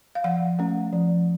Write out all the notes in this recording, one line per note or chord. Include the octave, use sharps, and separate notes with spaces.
F5
F3 F#5
A3 C#4
F3